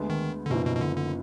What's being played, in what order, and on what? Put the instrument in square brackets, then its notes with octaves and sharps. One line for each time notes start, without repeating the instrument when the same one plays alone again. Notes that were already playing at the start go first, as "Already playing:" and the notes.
Already playing: [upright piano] D2 D3 G#3 B3
[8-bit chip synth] D#3
D3
[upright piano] F#1 F#2 F3 B3 D#4 [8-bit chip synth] B2
[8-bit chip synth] B2
B2
D3
D3